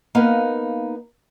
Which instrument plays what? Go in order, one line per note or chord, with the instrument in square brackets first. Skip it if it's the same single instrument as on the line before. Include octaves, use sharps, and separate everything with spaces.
[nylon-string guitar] A#3 B3 D#4 A#4 B4 F5